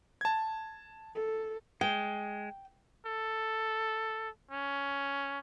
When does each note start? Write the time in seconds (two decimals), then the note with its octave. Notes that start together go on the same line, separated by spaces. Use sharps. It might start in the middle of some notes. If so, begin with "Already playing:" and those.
0.21 A5 G#6
1.15 A4
1.81 G#3 G5
3.06 A4
4.51 C#4